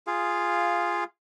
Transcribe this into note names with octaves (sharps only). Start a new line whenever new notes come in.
F4 G#4 F5